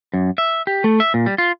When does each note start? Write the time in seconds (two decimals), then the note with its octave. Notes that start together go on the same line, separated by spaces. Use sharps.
0.14 F#2
0.38 E5
0.67 G4
0.84 A3
1.00 E5
1.14 A#2
1.26 G3
1.38 F4